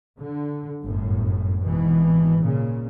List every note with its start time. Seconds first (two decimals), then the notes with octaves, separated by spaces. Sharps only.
0.21 D3
0.82 G1 F#2 A2
1.63 G#1 B2 E3
2.41 A#2 C#3